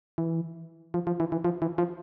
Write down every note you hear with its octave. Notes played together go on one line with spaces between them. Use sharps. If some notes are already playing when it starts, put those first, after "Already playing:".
E3
F3
F3
E3
E3
F3
E3
F3